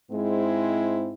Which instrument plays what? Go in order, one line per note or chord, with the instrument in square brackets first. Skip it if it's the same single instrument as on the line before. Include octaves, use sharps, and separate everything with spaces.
[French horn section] G#2 G#3 C4 E4